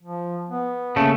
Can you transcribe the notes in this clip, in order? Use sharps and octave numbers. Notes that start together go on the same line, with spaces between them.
F3
B3
C#3 A3 A#3